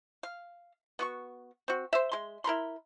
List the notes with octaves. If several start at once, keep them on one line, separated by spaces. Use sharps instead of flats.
F5
B3 F#4 C#6
C4 F#4
C5 E5
G#3 C6
E4 A#4 B5 C6